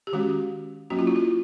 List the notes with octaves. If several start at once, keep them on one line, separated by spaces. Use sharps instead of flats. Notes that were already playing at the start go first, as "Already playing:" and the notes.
G4
D#3 G#3 C#4 F#4
F#3 A#3 C#4 F#4
F4
E4
F4